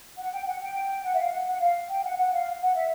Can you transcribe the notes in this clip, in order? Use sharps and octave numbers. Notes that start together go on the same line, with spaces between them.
F#5
G5
F#5
G5
F#5
E5
F5
F#5
F#5
F5
G5
F#5
F#5
F5
F#5
E5